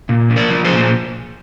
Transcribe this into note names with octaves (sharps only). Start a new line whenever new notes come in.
A#2
F3
A#4 D5
F3
G#4 C5
A#2